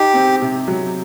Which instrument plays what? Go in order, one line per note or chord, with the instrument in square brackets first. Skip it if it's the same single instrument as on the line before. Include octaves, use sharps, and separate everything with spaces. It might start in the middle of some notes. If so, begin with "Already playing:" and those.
Already playing: [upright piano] D#4 [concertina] G4
[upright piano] C4
C3
F#3